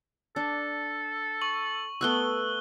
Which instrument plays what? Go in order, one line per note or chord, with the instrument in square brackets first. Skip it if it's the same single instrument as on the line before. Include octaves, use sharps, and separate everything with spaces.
[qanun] D4 [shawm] A4
[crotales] C#6 F#7
[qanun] A3 B3 C#6 [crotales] E6 F#6 G7